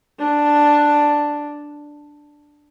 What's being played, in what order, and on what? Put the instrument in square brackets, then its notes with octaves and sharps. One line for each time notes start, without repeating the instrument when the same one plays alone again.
[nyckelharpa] D4